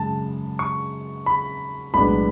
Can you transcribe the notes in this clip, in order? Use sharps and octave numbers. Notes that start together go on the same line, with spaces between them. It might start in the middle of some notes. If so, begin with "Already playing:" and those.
Already playing: F#2 C#3 G#3 A5
C#6
B5
B1 A2 G#3 B3 D4 B5